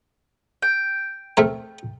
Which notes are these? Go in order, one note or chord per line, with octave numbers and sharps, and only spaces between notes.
G5
A3 C4 A#4